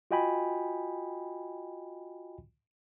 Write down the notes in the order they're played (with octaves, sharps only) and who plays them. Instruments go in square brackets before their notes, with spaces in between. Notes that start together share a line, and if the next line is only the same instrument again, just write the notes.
[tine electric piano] F4 F#4 D#5 G5 G#5 B5